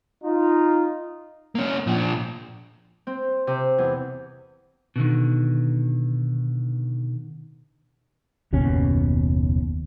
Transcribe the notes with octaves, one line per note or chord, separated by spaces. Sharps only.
D#4 F4
A#3 C#4
A#2 F3
C4
C3
E2
B2 D3 D#3
F#1 D#2 B2 C#4